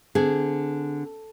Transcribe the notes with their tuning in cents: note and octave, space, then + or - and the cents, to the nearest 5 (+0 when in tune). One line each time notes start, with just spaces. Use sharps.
D3 +0 C4 -45 G#4 +0